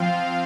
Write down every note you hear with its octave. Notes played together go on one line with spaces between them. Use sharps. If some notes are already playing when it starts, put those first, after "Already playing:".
Already playing: F3 C4 F4 F5